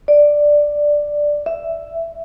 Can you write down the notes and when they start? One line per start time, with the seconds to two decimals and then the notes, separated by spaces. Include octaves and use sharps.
0.08 D5
1.46 E5